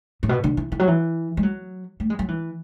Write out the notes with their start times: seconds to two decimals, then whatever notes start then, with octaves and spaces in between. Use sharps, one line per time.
0.23 A2
0.29 B2
0.44 D3
0.57 E3
0.72 E3
0.79 F#3
0.87 E3
1.37 G#3
1.43 F#3
2.00 A3
2.10 G#3
2.19 F#3
2.28 E3